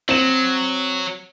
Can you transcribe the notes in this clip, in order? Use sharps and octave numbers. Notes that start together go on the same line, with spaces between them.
F#3 C4 E7